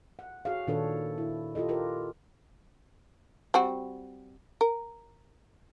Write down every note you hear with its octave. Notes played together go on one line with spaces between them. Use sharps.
F#5
F#4 G#4 C#5 F5
A#2 D#3 D4 A4 B4 C#5
E4
F4 G4 A4 D#5
F4 G4 A#4 B4
G3 C4 F#4
A#4